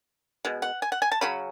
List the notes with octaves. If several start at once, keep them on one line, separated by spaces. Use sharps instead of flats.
B2 G#3
F#5
G#5
F#5
G#5
A5
C#3 F#3 C#4 B5